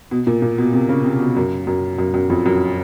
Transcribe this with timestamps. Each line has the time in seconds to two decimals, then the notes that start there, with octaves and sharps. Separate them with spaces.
0.11 B2
0.27 A#2
0.42 A#2
0.58 B2
0.73 C3
0.89 C#3
1.04 C3
1.20 B2
1.37 F#2
1.67 F#2
1.99 F#2
2.14 F#2
2.30 F2
2.46 F#2